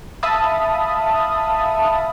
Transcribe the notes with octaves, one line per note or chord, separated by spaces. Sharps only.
E5 F5 A5 B5 D#6